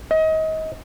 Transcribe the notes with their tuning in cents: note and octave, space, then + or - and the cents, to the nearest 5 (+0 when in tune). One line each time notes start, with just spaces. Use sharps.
D#5 +30